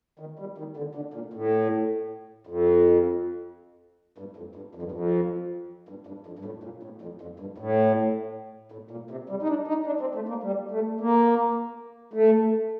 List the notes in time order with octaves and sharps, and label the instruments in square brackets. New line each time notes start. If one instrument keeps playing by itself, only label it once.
[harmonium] D#3
G3
D#3
D3
D3
A#2
A2
F2
G2
F2
G2
F2
G2
F2
G2
G2
F2
G2
A2
A#2
A2
F2
F2
G2
A2
A2
A#2
C3
G3
D#4
D4
D#4
D4
C4
A3
A#3
G3
A3
A#3
A3